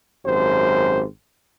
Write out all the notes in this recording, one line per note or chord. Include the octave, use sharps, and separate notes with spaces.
G#1 F#2 G4 C5